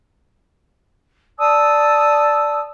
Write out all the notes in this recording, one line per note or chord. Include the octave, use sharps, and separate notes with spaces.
D5 A5 D#6 E6